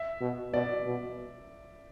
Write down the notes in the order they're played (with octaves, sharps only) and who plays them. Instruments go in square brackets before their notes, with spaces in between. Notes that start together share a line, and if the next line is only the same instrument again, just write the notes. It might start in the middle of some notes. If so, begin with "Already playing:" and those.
Already playing: [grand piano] E5
[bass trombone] B2
[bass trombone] B2 [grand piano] D5
[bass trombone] B2